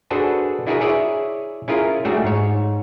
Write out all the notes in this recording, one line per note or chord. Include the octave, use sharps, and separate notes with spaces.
D4 F#4 G#4 A4 B4 C5
D4 E4 F#4 G#4 A#4 B4
E4 G#4 C#5 D5 E5
C#4 E4 F4 G#4 A#4
G3 A3 D4 F#4 G#4
G#2 C#5